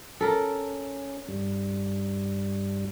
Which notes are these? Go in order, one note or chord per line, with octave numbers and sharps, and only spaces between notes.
C#4 A4 A#4
G2 G3